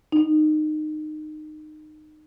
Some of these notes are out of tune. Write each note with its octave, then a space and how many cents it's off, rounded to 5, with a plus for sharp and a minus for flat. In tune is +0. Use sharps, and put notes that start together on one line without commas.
D#4 -20